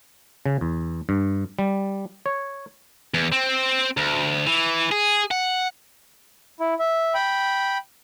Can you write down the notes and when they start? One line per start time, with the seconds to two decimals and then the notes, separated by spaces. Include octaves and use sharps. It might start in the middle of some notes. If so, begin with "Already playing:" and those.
0.46 C#3
0.61 E2
1.09 G2
1.59 G3
2.26 C#5
3.14 E2
3.32 C4
3.97 D2
4.46 E3
4.91 G#4
5.31 F#5
6.60 E4
6.79 E5
7.14 G5 B5